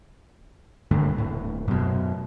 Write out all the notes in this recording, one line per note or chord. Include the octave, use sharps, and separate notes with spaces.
D#1 G2 D3 A3
D#1 A2
F#2 B2